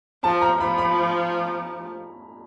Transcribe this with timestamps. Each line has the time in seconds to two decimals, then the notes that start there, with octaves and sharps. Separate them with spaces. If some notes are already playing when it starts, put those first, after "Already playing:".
0.24 F3 A5
0.41 A#5
0.60 F3 B5
0.78 B5